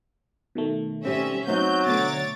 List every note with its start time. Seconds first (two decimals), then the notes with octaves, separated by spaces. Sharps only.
0.55 B2 D#3 A3
1.05 G3 C4 C#4 E5
1.47 F#3 B3 C4 D#4 G6
1.86 D2 B2 D3 C#5 D6 A6